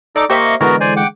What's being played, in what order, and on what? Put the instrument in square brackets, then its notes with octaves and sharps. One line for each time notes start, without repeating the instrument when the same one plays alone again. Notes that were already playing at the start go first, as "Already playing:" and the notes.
[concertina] D#4 A4 [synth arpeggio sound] D5 D6
[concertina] A#3 D#5 C#6 [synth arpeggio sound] G4 C5 E5
[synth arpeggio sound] D3 E3 G#3 [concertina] B3 F#4 A#4
[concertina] C5 D5 G#5
F#5 G5 D6